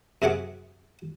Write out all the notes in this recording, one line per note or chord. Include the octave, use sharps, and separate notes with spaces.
F#2 C3 G#4 F#5 D6